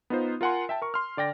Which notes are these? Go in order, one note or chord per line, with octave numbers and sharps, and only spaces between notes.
B3 D#4 F4 C5
F4 A#4 F#5 G#5 C6
E5 G5 A5
A#4 C#6
C6 F6
D3 D5 G5 A#6